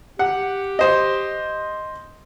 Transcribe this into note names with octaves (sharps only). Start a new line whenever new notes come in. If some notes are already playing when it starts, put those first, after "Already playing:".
G4 F#5
C5 D#5